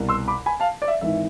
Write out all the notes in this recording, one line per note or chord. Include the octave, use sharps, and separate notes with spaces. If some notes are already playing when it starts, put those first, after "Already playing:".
Already playing: C2 B2
C6 E6
B5 D6
G#5 B5
F5 A5
D5
E5
G#1 G#2 E3 E5